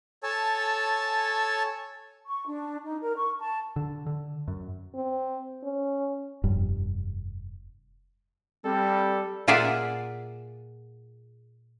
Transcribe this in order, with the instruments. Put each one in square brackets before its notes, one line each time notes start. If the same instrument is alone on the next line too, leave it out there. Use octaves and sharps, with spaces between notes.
[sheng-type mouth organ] A4 C#5 G#5 A5 E6
[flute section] C#6
D4
D#4
A#4
C#6
A5
[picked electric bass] D3
D3
F#2
[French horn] C4
C#4
[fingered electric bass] F1 G2
[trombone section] G3 [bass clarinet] C4 [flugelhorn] A4
[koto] A#2 F4 G#4 D5 E5 F#5